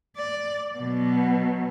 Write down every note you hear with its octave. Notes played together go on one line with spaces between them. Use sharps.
D5
B2 F#3